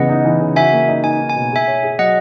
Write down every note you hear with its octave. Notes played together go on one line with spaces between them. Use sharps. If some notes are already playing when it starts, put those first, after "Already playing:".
Already playing: C#3 E3 B3 D#5 F#5
D#4
E3
C#3
F#4 E5 G#5
A#3
D#4
D#4 G#5
D#4
G#5
B2
G#4 E5 G#5
C#5
G#4
F#3 D#5 F#5